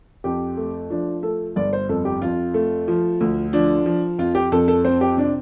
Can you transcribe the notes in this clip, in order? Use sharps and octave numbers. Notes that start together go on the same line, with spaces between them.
F2 G4
A3
F3 D4
A3 A4
G1 D5
C5
F2 A4
G4
F2 F4
A3
F3
D2
F3 D4
F3
F2 F4
G4
F2 A4
A4
C4 C5
G4
C3 D4